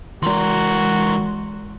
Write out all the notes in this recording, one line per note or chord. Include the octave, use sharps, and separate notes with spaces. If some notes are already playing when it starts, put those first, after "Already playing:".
E3 G#3 F#4 A#4 C6